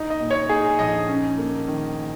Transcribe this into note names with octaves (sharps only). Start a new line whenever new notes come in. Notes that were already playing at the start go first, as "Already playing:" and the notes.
Already playing: D#4
D#5
A#2
C#5
D#4 G#4
A#1 D#5
C#4
A#3
D#3